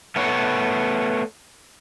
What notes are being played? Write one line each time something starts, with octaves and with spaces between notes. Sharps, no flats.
A3 B3 C#5